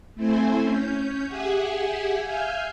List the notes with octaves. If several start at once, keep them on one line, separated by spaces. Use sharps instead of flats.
A3 C4 E4 C5 G#5
C#4 G6
G4 G#4 E5 F#5 G#5
E5 F5 G#5 F6 G6